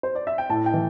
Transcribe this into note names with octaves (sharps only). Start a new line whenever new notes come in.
C5
D5
E5
G5
A2 A5
G5
E3